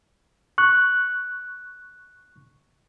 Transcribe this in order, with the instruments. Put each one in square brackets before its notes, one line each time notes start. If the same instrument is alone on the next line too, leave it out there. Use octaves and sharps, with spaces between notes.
[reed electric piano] C#6 F#6